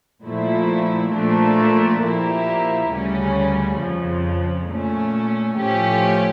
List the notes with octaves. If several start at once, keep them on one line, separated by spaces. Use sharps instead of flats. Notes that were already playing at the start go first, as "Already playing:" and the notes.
A#2 F3 A3 E4
A#2 F3 A3 D4
A#2 F3 A#3 E4 G4
D2 C#3 G3 C#4
F2 C#3 F3
A#2 A3 C#4
A2 F3 A3 C#4 G4